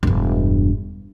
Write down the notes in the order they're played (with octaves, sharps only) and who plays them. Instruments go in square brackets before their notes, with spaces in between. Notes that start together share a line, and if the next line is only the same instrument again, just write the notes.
[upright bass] E1 G2